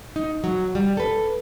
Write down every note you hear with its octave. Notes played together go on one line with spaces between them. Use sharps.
D#4
F#3
G3
A4 B4